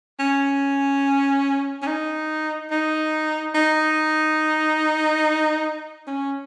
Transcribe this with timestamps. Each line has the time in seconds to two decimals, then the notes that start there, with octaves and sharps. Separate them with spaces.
0.20 C#4
1.83 C#4
1.87 D#4
2.71 D#4
3.55 D#4
6.07 C#4